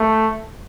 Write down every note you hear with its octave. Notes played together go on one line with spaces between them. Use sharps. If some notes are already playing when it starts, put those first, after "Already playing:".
Already playing: A3